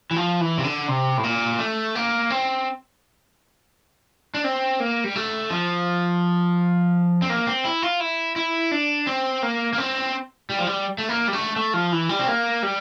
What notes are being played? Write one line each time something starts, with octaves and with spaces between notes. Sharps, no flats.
E3
F3
E3
C3
D3
C3
A2
A#2
A3
A#3
C4
D4
C4
A#3
G3
A3
F3
C4
A#3
C4
E4
F4
E4
E4
D4
C4
A#3
A#3
C4
G3
F3
G3
A3
A#3
G3
A3
A3
F3
E3
G3
C4
A#3
G3